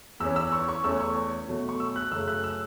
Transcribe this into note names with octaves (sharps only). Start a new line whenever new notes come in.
E2 E3 C#4 E6
E6
C#6
C#6
E2 E3 A3 C#4 E6
C#6
B2 F#3 A3 C#4
C#6
E6
F#6
F#2 C#3 A3 C#4 E6
F#6
E6